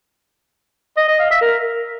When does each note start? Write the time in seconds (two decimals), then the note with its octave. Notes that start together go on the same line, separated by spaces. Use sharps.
0.97 D#5
1.08 D#5
1.19 F5
1.30 E5
1.42 A#4